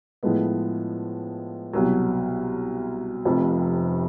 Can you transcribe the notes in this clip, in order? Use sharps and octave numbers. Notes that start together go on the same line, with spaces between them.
A2 F3 G#3 B3
C2 B2 F#3
F1 F2 C3 F3